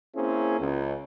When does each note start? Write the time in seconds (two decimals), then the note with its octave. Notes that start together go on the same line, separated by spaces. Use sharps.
0.15 A#3 C4 C#4 E4 G#4
0.60 C#2